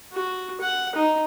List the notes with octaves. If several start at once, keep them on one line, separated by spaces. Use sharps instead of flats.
F#4
F#5
D#4